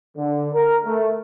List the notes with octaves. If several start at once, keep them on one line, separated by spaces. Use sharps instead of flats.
D3
A#4
A3